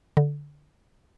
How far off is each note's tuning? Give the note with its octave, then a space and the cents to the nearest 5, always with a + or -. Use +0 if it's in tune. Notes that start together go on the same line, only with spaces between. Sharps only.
D3 -10